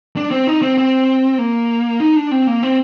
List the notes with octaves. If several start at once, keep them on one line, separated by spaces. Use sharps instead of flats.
D4
C4
D#4
C4
C4
A#3
D#4
D4
C4
A#3
C4